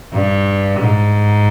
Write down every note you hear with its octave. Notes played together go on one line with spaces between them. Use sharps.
G2
G#2